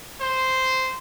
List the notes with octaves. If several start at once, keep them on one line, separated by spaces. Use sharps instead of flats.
C5